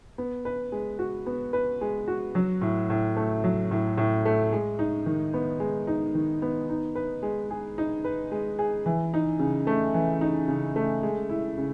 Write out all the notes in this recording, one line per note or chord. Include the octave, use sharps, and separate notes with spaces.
B3
B4
G#3
F#4
B3
B4
G#3
F#4
F#3
A2
A2
A3
F#3
A2
A2
A3
G#3
D#4
D#3
B3
G#3
D#4
D#3
B3
D#4
B4
G#3
G#4
D#4
B4
G#3
G#4
E3
D#4
C#3
A3
E3
D#4
C#3
A3
G#3
E4
C#3